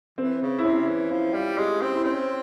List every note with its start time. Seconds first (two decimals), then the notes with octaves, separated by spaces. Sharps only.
0.18 E3 C4
0.42 C#3
0.59 E4
0.65 C3 C#4
0.88 E3
1.11 F3 E4
1.34 G3 F4
1.57 G#3 G4
1.81 C4 C#4
1.94 E4
2.04 C4 C#4